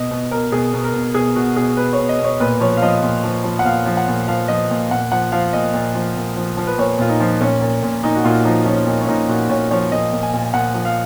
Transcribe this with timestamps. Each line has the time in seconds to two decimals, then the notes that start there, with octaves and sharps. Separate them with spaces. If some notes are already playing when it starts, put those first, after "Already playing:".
Already playing: B2 D#5
0.11 B2
0.31 B2 A#4
0.52 B2 G#4
0.73 B2
0.84 A#4
0.93 B2
1.14 B2 G#4
1.36 B2 F#4
1.56 B2 G#4
1.77 B2 B4
1.93 C#5
1.98 B2
2.09 D#5
2.19 B2
2.24 C#5
2.40 A#2 B4
2.60 F3 C#5
2.77 F5
2.82 F3 D#5
3.03 A#2
3.24 F3
3.44 F3
3.59 F#5
3.65 A#2 F5
3.86 F3
3.97 F#5
4.08 A#2
4.28 F3 F5
4.48 F3 D#5
4.70 A#2
4.91 A#2 F#5
5.12 F3 F#5
5.32 F3 F5
5.53 A#2 D#5
5.74 A#2
5.95 F3
6.16 A#2
6.37 F3
6.57 F3
6.67 B4
6.78 A#2 C#5
6.99 A#2 F4
7.09 D#4
7.20 F3
7.41 A#2 C#4
7.62 A#2
7.83 A#2
8.03 A#2 D#4
8.15 F#4
8.24 A#2 F4
8.45 F3 D#4
8.66 F3 C#4
8.87 A#2 D#4
9.01 C#4
9.08 A#2 D#4
9.28 A#2 F#4
9.49 A#2 C#5
9.71 F3 C#5
9.92 A#2 D#5
10.13 A#2
10.23 G#5
10.33 A#2
10.53 A#2 F#5
10.74 F3
10.85 F5